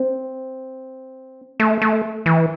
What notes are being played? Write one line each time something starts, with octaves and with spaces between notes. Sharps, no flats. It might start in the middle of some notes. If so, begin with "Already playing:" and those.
Already playing: C4
A3
A3
E3